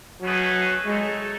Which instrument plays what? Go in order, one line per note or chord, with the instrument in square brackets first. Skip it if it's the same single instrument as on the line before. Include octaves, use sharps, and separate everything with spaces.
[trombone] F#3 [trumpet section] A3 C#4 G#4 B4 D#5
[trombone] G#3 [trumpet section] A3 D#4 A4 C#5